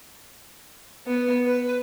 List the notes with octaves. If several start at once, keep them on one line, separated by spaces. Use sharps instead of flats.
B3
B4